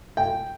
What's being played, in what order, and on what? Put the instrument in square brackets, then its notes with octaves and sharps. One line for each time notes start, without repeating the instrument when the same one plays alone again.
[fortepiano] G5